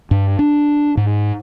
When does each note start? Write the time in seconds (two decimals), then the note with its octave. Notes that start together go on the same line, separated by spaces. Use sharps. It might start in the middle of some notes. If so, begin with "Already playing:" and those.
0.11 G2
0.39 D4
0.97 G#2